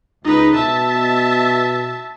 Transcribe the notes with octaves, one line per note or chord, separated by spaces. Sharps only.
C#2 D#4 B4
B2 E5 A5